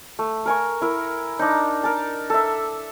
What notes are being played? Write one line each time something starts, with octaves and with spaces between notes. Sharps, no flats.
A3
A#4 G#5 C#6
E4 A#4
D4 D#4
A#4 A5
A4 E5